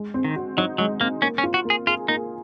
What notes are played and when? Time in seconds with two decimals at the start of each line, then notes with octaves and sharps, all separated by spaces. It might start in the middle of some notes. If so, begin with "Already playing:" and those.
Already playing: G#3
0.14 C4
0.25 D#3
0.36 F#4
0.57 F#3 D#4
0.78 F#3 G#3
1.00 A#3 C4
1.22 A#3 C#4
1.38 C#4
1.44 F4
1.54 F#4
1.65 A#3
1.70 G#4
1.87 F4 G#4
2.08 A#3 D#4